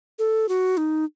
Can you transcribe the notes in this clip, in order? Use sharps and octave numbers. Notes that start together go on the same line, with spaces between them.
A4
F#4
D#4